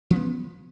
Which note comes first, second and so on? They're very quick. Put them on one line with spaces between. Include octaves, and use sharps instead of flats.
F3 C#4 B3